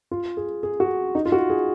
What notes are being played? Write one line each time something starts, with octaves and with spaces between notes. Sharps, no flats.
F4
G#4
G#4
F#4
D#4
F4
F#4
G#4